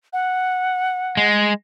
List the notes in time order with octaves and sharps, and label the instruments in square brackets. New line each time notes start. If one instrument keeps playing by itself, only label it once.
[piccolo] F#5
[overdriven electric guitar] G#3